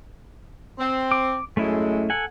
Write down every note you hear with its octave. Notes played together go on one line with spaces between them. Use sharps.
C4
D6
F#2 G#3 A3 C#4 E4
A4 F#5 G#5